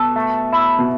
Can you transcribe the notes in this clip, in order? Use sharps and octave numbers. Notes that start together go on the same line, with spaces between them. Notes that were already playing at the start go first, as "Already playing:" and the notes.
Already playing: B2 A4
A3
E4
B2